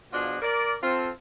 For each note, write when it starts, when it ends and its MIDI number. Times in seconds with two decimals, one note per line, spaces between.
0.13 0.39 47
0.13 0.39 53
0.13 0.39 62
0.13 0.39 65
0.13 0.39 66
0.13 0.39 68
0.42 0.75 70
0.42 0.75 74
0.82 1.09 60
0.82 1.09 65
0.82 1.09 69